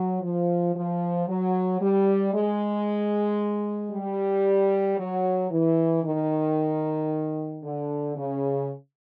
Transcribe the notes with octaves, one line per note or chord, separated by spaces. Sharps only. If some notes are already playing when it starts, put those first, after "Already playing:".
Already playing: F#3
F3
F3
F#3
G3
G#3
G3
F#3
E3
D#3
D3
C#3